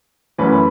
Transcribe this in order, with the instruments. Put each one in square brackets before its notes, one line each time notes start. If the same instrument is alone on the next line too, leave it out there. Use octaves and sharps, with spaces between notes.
[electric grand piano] F#2 E3 A3 C#4 F#4 [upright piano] B4